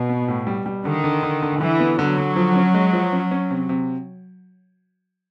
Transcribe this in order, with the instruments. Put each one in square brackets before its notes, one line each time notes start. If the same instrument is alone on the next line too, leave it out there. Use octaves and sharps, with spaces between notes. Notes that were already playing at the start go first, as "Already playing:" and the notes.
Already playing: [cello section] B2
[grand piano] B3
A2
G3
G3
[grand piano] D3 [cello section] D#3
[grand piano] D3
D3
D3
[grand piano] D3 [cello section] E3
[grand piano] B3
[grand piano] D3 [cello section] F#3
[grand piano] D3
F3
C#4
G#3
F3
C#4
C#4
C3
C3